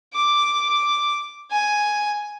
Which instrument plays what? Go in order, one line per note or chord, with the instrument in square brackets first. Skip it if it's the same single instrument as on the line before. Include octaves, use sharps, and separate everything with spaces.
[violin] D6
G#5